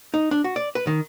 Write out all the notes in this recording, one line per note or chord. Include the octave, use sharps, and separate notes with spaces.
D#4
D4
F#4
D5
B4
D#3